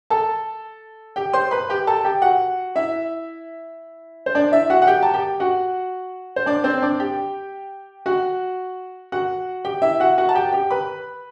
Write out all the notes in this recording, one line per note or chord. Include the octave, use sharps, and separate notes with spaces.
A4 A5
G4 G5
C5 C6
B4 B5
G4 G5
A4 A5
G4 G5
F#4 F#5
E4 E5
C5
D4 D5
E4 E5
F#4 F#5
F#5
G4 G5
A5
G4 G5
F#4 F#5
C5
D4 D5
C4 C5
D4 D5
G4 G5
F#4 F#5
F#4 F#5
G4 G5
E4 E5
F#4 F#5
F#4 F#5
A5
G4 G5
G4 G5
B4 B5